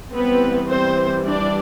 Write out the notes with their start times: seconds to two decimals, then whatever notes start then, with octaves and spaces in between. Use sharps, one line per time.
0.12 E3 G3 B3 C4 B4
0.69 C4 C5
1.25 D4 D5